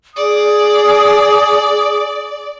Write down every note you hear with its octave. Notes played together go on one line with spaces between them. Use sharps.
G#4 D5 D#6